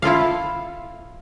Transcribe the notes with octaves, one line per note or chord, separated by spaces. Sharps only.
E4 F4 A4 F5